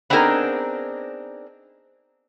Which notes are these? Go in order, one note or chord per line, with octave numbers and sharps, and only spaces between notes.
B3 C4 D4 D#4 G#4 A#4